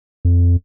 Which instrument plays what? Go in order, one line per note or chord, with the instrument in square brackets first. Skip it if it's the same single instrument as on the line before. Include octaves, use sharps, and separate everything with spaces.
[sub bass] F2